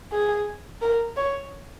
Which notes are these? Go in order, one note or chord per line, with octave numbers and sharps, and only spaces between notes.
G#4
A#4
C#5